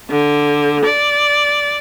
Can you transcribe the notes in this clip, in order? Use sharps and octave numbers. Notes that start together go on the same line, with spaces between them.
D3
D5